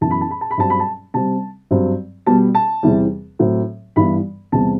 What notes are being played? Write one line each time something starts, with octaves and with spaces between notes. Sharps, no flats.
F#2 E3 B3 A5
B5
A5
B5
A5
B5
G2 F#3 C4 A5
B5
A5
C3 G3 C4 A5
G2 F#3 C4
B2 G3 B3 A5
A5
E2 C3 E3 G3
A2 F#3 C4
G2 E3 G3 B3 B5
E2 C3 G3 B3 A5